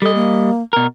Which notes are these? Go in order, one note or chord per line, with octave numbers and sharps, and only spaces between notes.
G3 A4 D#5
A#3
B2 A#4